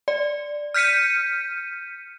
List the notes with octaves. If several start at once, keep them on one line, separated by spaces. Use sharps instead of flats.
D5
F6 G6 B6 C#7 D#7